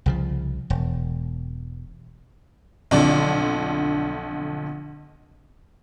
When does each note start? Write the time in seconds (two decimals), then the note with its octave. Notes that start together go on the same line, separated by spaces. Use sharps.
0.06 C2 C#3 F3
0.70 E1
2.91 B1 F2 D3 D5